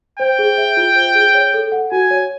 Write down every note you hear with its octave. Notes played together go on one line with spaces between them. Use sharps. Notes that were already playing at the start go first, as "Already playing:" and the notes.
C5 G5
G#4
E5
F4
C5
G#4
C#5
A4
F#5
F#4 G#5
C#5